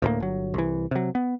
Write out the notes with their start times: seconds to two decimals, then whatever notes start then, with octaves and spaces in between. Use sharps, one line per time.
0.02 D2 A2 F#3 A#3
0.20 G1 F#3
0.54 C2 E3
0.91 C3 F#3
1.15 B3